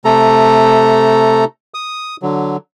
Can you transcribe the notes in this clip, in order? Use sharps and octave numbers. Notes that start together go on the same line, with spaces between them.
C3 A3 A4 A#5
D#6
D3 F#3